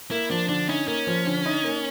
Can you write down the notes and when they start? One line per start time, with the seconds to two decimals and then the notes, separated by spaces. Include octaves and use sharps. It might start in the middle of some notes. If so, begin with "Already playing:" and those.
0.11 A#3 E4
0.30 F3 D4
0.49 D3 D4
0.69 C#4 D#4
0.87 A#3 C#4
1.07 F3
1.26 D3
1.46 D#4
1.64 A#3